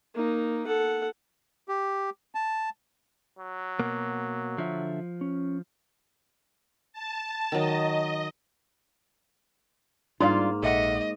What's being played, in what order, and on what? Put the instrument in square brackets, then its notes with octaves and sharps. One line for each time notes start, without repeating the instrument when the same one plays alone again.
[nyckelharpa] A#3 D#4
A4 F#5
[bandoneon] G4
A5
[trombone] F#3
[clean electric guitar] B2 A#3
[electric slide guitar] D3 E5 [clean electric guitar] F3
[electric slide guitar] C#4
[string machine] A5
[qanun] D#3 F#3 [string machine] D#5
[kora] G#2 A#3 [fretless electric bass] G3 D4 [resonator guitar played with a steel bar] F4 D5 F5
[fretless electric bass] A#1 [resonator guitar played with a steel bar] A4 E5 F#5 [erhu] D#5